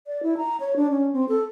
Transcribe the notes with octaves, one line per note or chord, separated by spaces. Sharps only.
D5
E4
A#5
C#5
D4
C#4
C4
A4